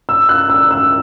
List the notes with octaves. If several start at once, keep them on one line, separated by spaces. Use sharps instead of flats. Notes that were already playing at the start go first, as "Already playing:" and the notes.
E6
F#6
E6
E6